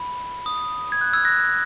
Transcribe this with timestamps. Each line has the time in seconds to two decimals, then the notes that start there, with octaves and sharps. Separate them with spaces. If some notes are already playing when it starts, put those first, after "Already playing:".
Already playing: B5
0.46 D#6
0.92 G#6
1.01 F#6
1.13 E6 G#6
1.25 F#6 A#6